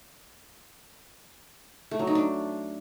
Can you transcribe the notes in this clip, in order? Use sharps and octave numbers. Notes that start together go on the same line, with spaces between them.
A3
F#3
D#4
D4